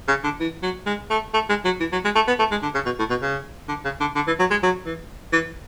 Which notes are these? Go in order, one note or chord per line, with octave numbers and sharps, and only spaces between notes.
C#3
D3
E3
F#3
G#3
A3
A3
G#3
F#3
E3
F#3
G#3
A3
B3
A3
G#3
D3
C#3
B2
A2
B2
C#3
D3
C#3
D3
D3
E3
F#3
G#3
F#3
E3
E3